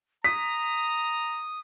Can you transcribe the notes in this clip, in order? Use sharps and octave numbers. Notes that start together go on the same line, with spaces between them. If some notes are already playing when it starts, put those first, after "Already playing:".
A#5 D#6 B6